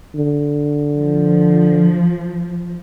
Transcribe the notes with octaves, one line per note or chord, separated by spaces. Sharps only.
D3
F3